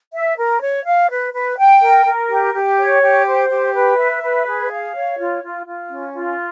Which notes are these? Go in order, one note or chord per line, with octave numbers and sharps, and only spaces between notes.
E5
A#4
C#5
F5
B4
B4
G5
A#4
A#4
G4
G4
C#5
G4
C5
G4
B4
E5
B4
G#4
F5
C#5
F4
F4
F4
C#4
F4